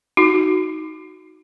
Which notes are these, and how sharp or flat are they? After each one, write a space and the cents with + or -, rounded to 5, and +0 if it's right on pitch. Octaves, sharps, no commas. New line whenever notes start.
D#4 +15 F#4 +0